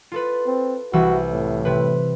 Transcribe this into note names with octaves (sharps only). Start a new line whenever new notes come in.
F4 A4 B4
C4
C2 E3 F#4 E6
A2
C3 B4